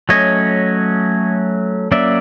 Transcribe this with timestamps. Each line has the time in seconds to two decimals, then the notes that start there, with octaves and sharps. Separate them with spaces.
0.09 F#3 A3 C#4 C#5 D#5
1.92 F#3 A#3 C#4 D5 E5